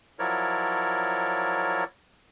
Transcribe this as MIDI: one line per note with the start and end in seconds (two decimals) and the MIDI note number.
0.19 1.84 53
0.19 1.84 54
0.19 1.84 64
0.19 1.84 70
0.19 1.84 73
0.19 1.84 74